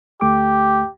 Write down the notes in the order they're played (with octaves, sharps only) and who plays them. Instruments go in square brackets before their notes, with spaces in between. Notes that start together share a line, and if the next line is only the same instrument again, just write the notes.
[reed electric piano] D2 A3 D6 [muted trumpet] G4